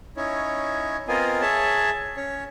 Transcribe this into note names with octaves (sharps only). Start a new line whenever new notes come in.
C#4 D#4 E4 C#5
B3 C4 F4 A#4 D#5 G#5
G#4 C#5 E5 A5
C#4 C#5